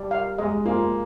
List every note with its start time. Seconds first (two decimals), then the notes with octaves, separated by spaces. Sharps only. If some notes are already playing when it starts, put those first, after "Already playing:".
Already playing: G3 D5
0.11 F5
0.38 G#3 D#5
0.65 A#3 F4